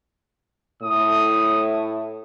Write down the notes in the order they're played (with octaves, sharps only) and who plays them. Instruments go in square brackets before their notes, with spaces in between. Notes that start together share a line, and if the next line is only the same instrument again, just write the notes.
[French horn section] A2 [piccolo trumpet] D#6